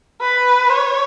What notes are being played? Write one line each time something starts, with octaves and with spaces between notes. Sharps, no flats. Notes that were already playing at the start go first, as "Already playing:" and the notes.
B4
C#5